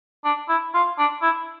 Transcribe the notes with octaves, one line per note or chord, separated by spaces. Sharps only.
D4
E4
F4
D4
E4